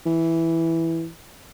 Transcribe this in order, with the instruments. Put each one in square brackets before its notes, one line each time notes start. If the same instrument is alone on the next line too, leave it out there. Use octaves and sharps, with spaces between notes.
[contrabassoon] E3